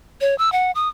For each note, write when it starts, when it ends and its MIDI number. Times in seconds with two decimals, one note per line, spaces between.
0.21 0.37 73
0.38 0.52 88
0.52 0.71 78
0.75 0.88 87